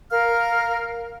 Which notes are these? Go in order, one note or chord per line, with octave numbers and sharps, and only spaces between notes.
A#4 F5 F6